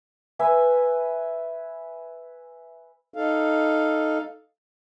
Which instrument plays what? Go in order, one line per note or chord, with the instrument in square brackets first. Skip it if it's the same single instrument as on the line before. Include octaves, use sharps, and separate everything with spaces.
[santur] B4 E5 G#5
[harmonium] D#4 A4 F5